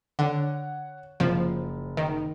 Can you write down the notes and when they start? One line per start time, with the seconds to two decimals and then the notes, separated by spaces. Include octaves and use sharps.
0.19 D3 C#5 F#5
1.20 F#1 F3
1.97 D#3